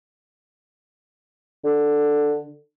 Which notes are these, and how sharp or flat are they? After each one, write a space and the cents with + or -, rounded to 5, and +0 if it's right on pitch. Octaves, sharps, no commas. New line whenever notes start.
D3 +5